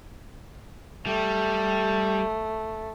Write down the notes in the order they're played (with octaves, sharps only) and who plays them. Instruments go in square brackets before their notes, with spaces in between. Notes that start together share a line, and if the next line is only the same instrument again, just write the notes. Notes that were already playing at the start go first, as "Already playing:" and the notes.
[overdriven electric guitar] G3 [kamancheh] A3